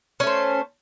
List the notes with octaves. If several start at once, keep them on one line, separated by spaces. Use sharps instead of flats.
A3 C#4 C5